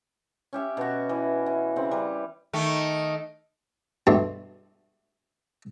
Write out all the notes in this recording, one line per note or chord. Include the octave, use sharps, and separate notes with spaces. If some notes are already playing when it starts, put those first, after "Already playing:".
C#4 G4 E5 F5
B2 F#4
E3
E3
C#3 C4 F#5
G3 B4
D#3 A3
G2 B2 E3 A3 C4